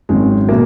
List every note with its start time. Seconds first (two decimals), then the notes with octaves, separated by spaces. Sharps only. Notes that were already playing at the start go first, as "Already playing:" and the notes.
0.09 G#1 F#2 D#3 G#3
0.49 B2 A#3